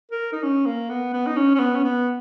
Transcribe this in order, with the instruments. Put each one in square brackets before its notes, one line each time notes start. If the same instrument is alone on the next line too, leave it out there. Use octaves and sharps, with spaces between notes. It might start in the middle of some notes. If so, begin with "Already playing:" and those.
[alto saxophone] A#4
D#4
C#4
A#3
B3
B3
D#4
C#4
C#4
B3
C#4
B3